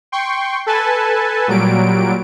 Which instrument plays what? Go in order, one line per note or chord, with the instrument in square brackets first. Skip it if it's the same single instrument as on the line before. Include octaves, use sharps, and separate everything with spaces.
[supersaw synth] G5 C6 C#6
A4 B4 G#5 A5
A#2 F#3 G3 D7